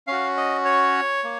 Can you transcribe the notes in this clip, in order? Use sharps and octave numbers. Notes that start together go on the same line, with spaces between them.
C#4 F#4 F5
D#5
C#5
A#3